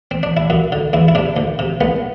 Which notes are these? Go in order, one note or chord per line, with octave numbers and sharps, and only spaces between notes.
C4
D4
E4
F#2 F#4
D3
E2 E4
E4
C3 D4
D2
C3
C2 B3